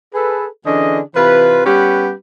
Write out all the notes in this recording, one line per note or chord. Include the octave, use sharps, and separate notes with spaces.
G#4 A4 B4
D3 E3 C#4 D4 G#4 D#5
C3 E3 F4 B4
G3 B3 C#4 G4 B4 F#5